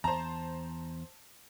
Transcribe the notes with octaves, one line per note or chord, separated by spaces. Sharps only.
E2 C5 A5 A#5